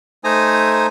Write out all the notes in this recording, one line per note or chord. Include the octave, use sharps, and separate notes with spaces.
A3 D#4 C5 G#5 A#5 D#6